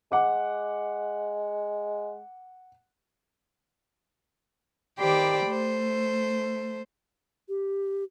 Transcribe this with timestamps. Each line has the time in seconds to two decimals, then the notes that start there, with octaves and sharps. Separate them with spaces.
0.12 G#3 F#5 D6
4.99 D#3 G4 C5 D5 G5 B5
5.46 A3 C5
7.49 G4